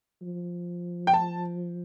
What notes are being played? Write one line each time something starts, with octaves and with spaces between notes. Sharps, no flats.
F3
G5
A5